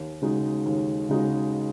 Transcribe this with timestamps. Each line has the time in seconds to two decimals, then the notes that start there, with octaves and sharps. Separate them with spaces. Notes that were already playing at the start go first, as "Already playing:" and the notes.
Already playing: D#2
0.22 C#3 G#3 D#4 F#4
0.66 D#2
1.09 C#3 G#3 D#4 F#4